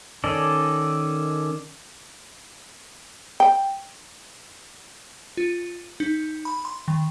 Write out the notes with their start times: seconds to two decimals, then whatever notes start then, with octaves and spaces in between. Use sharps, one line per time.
0.24 D#3 C#4 A4 D5 D#5
3.40 G5
5.37 F4
6.00 D#4
6.45 B5
6.65 C6
6.88 D#3